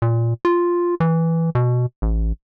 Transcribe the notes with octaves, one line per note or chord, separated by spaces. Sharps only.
A#2
F4
E3
B2
A1